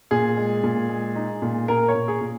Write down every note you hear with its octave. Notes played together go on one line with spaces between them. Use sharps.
A#2 G#4
G#3
A#2
G#3
D#4
A#2
A#2 A#4
C#5
A#2
G#4
A#2